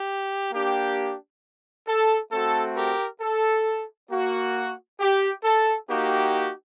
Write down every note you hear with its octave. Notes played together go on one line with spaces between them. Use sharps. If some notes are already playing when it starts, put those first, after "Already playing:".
Already playing: G4
A#3 D4 G4
A4
A3 C4 F#4 A4
G4 A#4
A4
A#3 F#4
G4
A4
A#3 D#4 F#4 G4